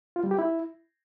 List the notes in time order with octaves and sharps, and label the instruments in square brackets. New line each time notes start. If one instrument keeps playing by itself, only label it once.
[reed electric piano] F4
G3
G4
E4